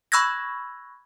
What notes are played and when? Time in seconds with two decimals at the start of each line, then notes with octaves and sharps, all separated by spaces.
0.12 B5 C#6 E6 F#6 G#6 A#6